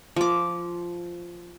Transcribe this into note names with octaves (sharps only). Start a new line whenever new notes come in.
F3 D6